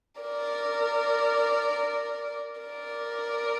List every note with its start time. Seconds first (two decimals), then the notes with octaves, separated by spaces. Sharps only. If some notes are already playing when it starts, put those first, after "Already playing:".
0.21 A#4 D5
2.60 A#4 D5